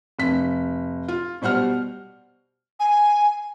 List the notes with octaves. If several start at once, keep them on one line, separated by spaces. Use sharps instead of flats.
F1 B6
F4
B2 G3 C5 F#5 F6
G#5